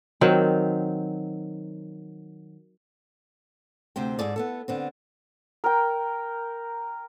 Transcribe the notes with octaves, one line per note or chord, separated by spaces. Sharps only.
D#3 F#3 C4
D2 C3 C5 G5
G#2 G#4 A4 D5
B3 E4 A4
D3 B3 C4
A#4 G5